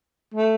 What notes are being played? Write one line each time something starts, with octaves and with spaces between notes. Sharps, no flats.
A3